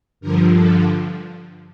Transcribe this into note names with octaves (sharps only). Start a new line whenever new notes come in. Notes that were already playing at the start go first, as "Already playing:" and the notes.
G2 D3 F3 A#4
A4